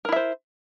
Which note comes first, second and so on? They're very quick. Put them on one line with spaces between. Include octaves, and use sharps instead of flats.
A#4 E4 E5 C5